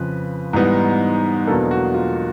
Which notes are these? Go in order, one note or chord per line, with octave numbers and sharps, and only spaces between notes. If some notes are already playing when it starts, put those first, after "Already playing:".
Already playing: F2 C#3 F3 B4
G#2 E3 G3 B3 D#4
E2 B2 F#3 A#3 D4 A4
F#4
F4